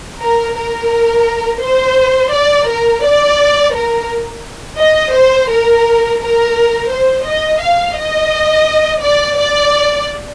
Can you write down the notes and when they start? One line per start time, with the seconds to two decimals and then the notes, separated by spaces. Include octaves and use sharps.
0.21 A#4
0.56 A#4
1.62 C5
2.32 D5
2.68 A#4
3.04 D5
3.74 A#4
4.79 D#5
5.14 C5
5.50 A#4
6.20 A#4
6.91 C5
7.26 D#5
7.61 F5
7.97 D#5
9.03 D5
9.38 D5